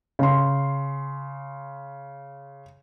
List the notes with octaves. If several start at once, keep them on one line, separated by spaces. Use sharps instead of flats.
C#3 C6